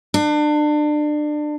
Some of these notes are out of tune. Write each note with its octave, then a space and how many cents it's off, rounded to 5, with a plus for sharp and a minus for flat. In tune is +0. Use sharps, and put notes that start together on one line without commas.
D4 +30